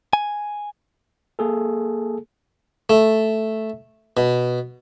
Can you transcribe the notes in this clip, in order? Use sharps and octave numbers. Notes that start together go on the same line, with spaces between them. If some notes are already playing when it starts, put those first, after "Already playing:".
G#5
A#3 G#4 A4
A3
B2